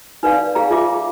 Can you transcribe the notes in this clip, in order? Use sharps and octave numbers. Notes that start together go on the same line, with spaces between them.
D#4 B4 D5 F5
G#4 F5 A#5
F4 G#4 E5 D6